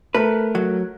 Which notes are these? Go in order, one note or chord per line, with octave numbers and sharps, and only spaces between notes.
A3 A#4 B4
F#3